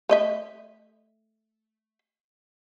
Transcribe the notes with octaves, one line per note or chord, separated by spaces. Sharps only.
A3 D#5 E5